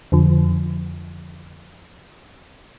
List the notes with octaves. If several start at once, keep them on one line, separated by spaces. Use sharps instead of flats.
F2 D3 F3